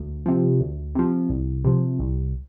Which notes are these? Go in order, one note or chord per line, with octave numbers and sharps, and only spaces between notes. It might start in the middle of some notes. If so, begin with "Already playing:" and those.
Already playing: D2
C3 F3
D2
C3 F3
C2
C3 F3
C2